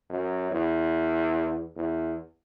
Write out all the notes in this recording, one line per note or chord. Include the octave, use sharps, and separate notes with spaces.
F#2
E2
E2